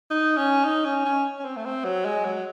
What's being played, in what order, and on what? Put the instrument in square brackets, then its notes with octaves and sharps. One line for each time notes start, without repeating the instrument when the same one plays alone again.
[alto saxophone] D#4
C#4
D#4
C#4
C#4
C#4
C4
A3
C4
F#3
G#3
F#3